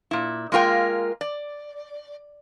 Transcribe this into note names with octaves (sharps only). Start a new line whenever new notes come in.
A#2 E4
G#3 A#3 F4 A#4 G5
D5